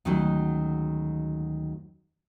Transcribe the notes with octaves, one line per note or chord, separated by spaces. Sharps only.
D2 D#3 F#3 G#3 C#4 G#5